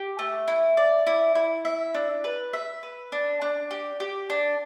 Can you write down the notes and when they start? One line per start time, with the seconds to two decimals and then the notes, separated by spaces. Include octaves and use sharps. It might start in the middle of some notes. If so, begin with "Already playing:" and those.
Already playing: G4
0.19 A3
0.48 E4
0.77 D5
1.07 E4
1.35 E4
1.65 E5
1.94 D4
2.24 B4
2.53 E5
2.83 B4
3.12 D4
3.42 D4
3.71 G4
4.00 G4
4.30 D4